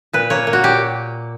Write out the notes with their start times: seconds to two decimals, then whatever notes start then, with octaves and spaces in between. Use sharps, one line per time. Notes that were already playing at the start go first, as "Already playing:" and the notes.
0.13 A#2 B4
0.30 A#3 C#5
0.47 A#3
0.53 F#4
0.63 A#2 G4